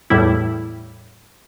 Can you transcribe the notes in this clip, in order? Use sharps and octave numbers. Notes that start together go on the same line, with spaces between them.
E2 A2 G3 E4